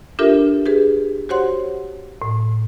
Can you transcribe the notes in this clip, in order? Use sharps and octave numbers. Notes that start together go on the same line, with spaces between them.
D4 F4 G4 A4 A#4 E5
G4 G#4 B4
F#4 G4 C5 C#5 F#5 C6
A2